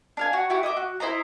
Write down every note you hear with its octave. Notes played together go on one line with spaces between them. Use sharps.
D4 F5 G#5
F#4
E4 F#4 G4
D#5 E5 D6
F#4
E4 C5 D#5 A#5